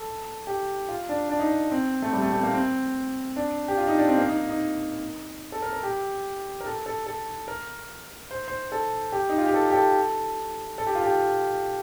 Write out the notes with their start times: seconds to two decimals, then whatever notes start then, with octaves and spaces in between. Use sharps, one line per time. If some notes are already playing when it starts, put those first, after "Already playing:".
Already playing: A4
0.47 G4
0.89 F4
1.09 D4
1.29 D4
1.39 D#4
1.48 D4
1.71 C4
2.02 A3
2.13 G3
2.22 A3
2.33 A3
2.43 A#3
2.53 C4
3.36 D4
3.68 G4
3.77 F4
3.87 D#4
3.98 D4
4.08 C4
4.18 A#3
4.28 D#4
4.38 D#4
4.49 D#4
5.52 A4
5.62 A#4
5.73 A#4
5.83 G4
6.61 A#4
6.66 A4
6.86 A4
7.06 A4
7.48 A#4
8.31 C5
8.48 C5
8.72 A4
9.12 G4
9.29 D#4
9.38 F4
9.46 G4
9.54 A4
9.70 G4
9.75 A4
10.78 A4
10.87 G4
10.95 F4
11.04 G4